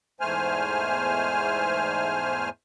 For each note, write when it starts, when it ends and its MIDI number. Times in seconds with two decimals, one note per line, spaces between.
0.20 2.49 40
0.20 2.49 44
0.20 2.49 57
0.20 2.49 72
0.20 2.49 80
0.20 2.49 89